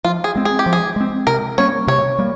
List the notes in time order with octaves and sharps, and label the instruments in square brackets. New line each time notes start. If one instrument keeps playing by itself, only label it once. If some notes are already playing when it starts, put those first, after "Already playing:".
[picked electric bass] F3 [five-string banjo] F4
[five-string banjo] G#4
[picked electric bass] G#3 C4
[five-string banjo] G#4
G4
[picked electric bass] F3
[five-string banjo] G#4
[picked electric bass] G#3 C4
[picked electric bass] C3 [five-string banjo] A#4
[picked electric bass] G3 A#3 C#4 [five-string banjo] C#5
[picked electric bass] C3 [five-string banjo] C#5
[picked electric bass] G3 A#3